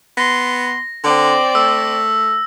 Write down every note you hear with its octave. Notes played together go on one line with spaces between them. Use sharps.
B3 C6 A#6
D3 C4 D5
A3 E6